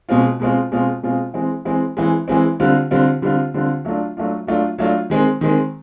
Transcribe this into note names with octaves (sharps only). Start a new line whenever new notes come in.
B2 G#3 C4 F4
B2 G#3 C4 F4
B2 G#3 C4 F4
B2 G#3 C4 F4
E3 G#3 C4
E3 G#3 C4
E3 G#3 C4
E3 G#3 C4
D3 G3 C4 F4
D3 G3 C4 F4
D3 G3 C4 F4
D3 G3 C4 F4
F#3 A3 D4 F4
F#3 A3 D4 F4
F#3 A3 D4 F4
F#3 A3 D4 F4
D#3 G#3 C4
D#3 G#3 C4